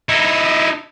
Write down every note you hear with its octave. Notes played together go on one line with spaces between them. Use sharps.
D#4 E4